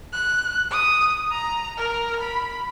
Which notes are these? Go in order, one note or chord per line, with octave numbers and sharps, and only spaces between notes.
F#6
D#6
A#5
A#4
B5